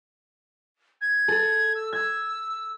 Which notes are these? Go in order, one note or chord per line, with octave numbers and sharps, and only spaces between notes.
G#6
A4
E6
E6 G#6